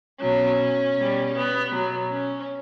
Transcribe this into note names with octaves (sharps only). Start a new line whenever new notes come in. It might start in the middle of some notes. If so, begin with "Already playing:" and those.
B2 F#3 C#4
B2 G3
B3
B2 F#3
C#4